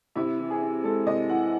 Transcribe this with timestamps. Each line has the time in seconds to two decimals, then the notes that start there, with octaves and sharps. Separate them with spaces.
0.15 C3 E4
0.39 E3
0.50 G#4
0.61 C4
0.84 G#3 A4
1.07 C3 D#5
1.29 E3 F#5